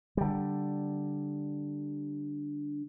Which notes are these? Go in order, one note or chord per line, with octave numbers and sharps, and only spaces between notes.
D3 G3